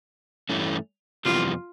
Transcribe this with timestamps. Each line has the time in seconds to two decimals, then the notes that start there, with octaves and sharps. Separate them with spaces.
0.49 G2 E3 A3 C#4
1.25 F2 C3 E3 G3 B3 F4